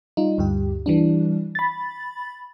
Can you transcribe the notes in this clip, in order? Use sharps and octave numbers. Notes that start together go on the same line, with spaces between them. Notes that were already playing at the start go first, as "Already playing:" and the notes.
G3 D#4 F4
D2 G2 G4
E3 G3 D4
B5 A6